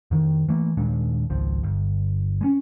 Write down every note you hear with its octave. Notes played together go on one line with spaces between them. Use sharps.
F2 D#3
E3 A3 A#3
D#2 A#2 G#3 D4
G#1 C#2 F3
G1
G#3 C#4